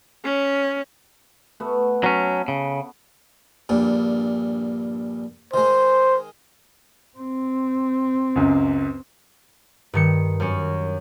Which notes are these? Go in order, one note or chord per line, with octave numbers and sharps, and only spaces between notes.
C#4
A3 B3 F#4
F#3 C#4
C#3
A#1 G2 A#2
D#3 G#3 C5
C4
C#2 F#2
G2 D#3 C#7
F#2 C#4